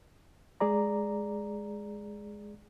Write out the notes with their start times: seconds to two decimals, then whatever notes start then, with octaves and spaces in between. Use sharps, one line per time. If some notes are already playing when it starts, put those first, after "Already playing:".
0.60 G#3 G#4 D5 A#5